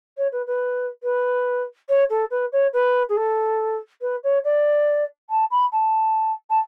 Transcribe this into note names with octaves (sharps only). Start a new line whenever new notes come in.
C#5
B4
B4
B4
C#5
A4
B4
C#5
B4
G#4
A4
B4
C#5
D5
A5
B5
A5
A5